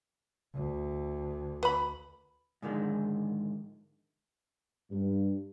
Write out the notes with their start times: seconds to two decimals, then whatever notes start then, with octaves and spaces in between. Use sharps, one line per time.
0.55 D2
1.63 B4 B5
2.62 G#2 D3 D#3 F3 G#3
4.91 G2